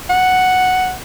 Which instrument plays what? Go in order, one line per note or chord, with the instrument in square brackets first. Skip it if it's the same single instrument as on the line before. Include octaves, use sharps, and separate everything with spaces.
[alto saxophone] F#5